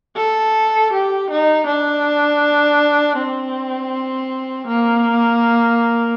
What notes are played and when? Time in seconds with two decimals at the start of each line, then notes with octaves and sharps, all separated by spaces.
0.17 A4
0.93 G4
1.30 D#4
1.67 D4
3.17 C4
4.67 A#3